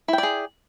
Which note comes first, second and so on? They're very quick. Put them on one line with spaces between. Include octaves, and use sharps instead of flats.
E4 G5 D5 G#4